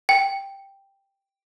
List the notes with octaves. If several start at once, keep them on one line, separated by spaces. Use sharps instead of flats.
G5